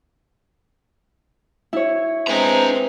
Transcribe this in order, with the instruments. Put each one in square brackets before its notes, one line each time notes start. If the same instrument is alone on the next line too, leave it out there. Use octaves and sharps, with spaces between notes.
[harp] E4 C#5
[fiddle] G#3 C4 [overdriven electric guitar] D4 A#5 [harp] B4